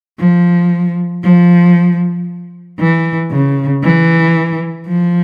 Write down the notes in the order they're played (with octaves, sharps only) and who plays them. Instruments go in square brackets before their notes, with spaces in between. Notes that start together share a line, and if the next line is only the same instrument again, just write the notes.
[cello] F3
F3
E3
C#3
E3
F3